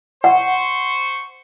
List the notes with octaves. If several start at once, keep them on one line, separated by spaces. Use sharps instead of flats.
C5 F#5 C#6